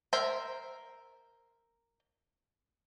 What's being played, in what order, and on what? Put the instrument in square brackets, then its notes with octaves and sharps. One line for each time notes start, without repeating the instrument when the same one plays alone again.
[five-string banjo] A#4 C5 E5